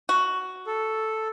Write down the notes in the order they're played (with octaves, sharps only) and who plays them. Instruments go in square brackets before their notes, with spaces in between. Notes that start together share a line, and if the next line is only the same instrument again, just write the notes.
[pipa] F#4
[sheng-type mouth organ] A4